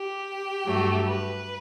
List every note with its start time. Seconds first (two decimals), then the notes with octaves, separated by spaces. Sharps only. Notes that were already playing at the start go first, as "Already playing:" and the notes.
Already playing: G4
0.66 G2 F#3 A3
1.06 B4